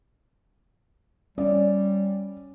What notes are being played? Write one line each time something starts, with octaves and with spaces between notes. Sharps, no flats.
G3 C#4 D5